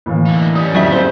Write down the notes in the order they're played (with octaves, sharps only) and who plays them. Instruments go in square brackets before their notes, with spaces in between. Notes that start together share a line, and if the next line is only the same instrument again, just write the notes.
[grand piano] A2 E3 A#3
[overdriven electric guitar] D3 D#4
[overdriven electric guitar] G3 C#4 [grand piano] D#6
[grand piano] F2 [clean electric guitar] F#3 E4 E5
[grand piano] G#3 [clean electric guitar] C4 C5